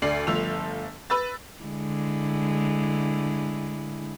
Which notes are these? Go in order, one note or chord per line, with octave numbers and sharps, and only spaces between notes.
D2 D5 C7 F#7
G1 F3 A3 E6 F7
B4 B5 E6 A6
D3 G#3 E4